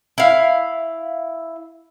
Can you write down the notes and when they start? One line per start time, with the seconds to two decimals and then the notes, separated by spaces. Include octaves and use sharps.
0.18 E4 F5